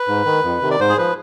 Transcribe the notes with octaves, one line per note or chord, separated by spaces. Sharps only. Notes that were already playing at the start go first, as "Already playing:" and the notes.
Already playing: B4
G#2
D#3
F2
C3 D#3
D5
G#2 C5
G#4
F3 B4